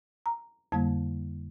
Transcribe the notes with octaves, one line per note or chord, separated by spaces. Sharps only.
A#5
F2 D3 G3 A#3 A5